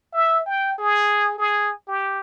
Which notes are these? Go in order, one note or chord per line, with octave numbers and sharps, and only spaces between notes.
E5
G5
G#4
G#4
G4